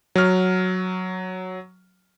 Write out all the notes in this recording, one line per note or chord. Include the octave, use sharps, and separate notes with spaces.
F#3 F6